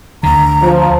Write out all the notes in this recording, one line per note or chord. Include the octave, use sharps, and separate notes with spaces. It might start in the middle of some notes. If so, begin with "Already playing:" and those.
D2 D3 A#5
F3